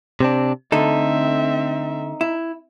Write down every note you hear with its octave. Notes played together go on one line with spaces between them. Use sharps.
C3 C4 D4
D3 A3 C4 D#4 A4 E5
E4